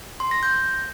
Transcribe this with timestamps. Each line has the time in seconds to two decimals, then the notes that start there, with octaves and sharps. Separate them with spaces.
0.20 C6
0.31 A#6
0.43 G6